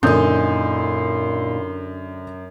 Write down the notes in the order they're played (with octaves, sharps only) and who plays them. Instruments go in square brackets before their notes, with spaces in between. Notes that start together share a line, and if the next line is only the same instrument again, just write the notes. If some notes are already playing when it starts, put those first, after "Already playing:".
[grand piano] F#2 [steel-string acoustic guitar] A#2 D#4 [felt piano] D3 D#6 G6 [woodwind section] E4 C6